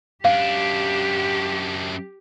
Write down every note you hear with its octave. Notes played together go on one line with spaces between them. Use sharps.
F#2 D4 G4 F5